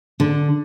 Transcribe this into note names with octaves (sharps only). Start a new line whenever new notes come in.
D3